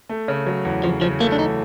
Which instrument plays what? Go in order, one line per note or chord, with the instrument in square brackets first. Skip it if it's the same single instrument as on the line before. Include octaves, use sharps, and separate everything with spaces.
[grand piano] A3
C#3
F#3
E2
[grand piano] C#3 [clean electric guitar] F3
[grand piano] C#3 [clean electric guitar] F3
[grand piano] A3 [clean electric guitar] A#3
[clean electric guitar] D4
[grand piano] E2 [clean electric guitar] D#4